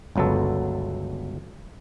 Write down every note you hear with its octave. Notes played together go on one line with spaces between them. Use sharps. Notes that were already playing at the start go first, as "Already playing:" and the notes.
G1 C#2 F#3 B3 A4